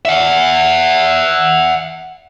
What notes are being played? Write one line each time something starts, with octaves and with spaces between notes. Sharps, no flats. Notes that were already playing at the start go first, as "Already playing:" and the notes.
E5 F#5